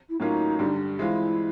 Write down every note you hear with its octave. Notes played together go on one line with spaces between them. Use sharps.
E4
A2 F#3 A#3 C#4 D#4 F4
G2 D3 G3
E3 G#3 C4 E4 F4